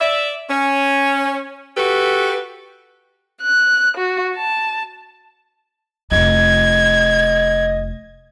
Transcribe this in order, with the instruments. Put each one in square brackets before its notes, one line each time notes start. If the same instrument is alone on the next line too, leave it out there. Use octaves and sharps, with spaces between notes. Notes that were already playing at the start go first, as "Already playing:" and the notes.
[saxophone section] D5 E5
C#4
F#4 G4 A4 B4
[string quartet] F#6
F#4
A5
[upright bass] F1 F4 [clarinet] D#5 [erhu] G#6